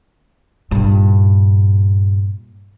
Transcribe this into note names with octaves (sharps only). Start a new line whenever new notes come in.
G2 A#2